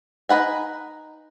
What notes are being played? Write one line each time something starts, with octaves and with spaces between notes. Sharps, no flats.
D#4 F4 B4 F#5 G#5